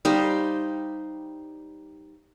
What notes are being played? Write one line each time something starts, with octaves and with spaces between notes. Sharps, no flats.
G3 D#4 C5 F5